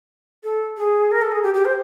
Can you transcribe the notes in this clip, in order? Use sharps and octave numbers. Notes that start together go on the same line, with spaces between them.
A4
G#4
A#4
A4
G#4
G4
G4
C5